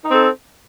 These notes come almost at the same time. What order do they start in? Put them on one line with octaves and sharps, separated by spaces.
D#4 C4 A4